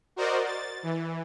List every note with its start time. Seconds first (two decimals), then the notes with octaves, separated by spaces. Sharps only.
0.16 F#4 A#4 C5 D5 D#5
0.45 A6
0.83 E3